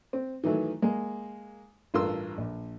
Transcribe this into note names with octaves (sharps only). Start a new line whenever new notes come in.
C4
D#3 E3 F#3 A3
G#3 A#3
A1 G2 F4 A#4 C6 E6
A#1